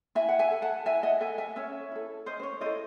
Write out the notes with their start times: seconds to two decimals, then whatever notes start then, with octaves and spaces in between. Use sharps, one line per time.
0.15 E4 E5 G#5
0.29 F#5
0.39 E5 G#5
0.51 A4
0.62 F#5 A5
0.86 E4 E5 G#5
1.03 D#5 F#5
1.20 A4 E5 G#5
1.38 E5 G#5
1.56 C#4 C#5 E5
1.92 E4 A4
2.26 C#4 C5 D#5
2.40 C5
2.43 C#5
2.61 E4 A4 C5 D#5